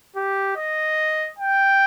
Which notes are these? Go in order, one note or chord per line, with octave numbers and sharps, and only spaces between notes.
G4
D#5
G5